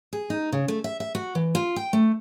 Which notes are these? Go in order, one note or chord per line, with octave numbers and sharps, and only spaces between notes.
G#4
D#4
C#3
A3
E5
E5
F#4
E3
F4
G5
A3